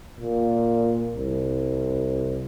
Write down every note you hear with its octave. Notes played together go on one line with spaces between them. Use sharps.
A#2
C2